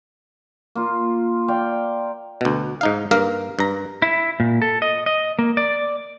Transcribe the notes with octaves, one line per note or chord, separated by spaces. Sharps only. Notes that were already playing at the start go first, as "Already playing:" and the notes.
A#3 F4
D5 F5 G5
D2 B2
G#2 D#4 F5
G2 A#3 A#4 F5
G2 A#5
E4
A#2
A4
D#5
D#5
A#3
D5